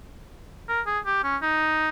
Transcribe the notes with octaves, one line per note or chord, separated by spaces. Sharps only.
A#4
G#4
G4
C#4
D#4